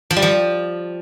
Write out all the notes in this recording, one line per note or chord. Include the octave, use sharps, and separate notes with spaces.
F3
G3
F3